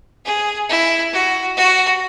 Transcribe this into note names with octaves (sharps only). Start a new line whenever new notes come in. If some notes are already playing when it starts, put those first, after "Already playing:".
G#4
E4
F#4
F#4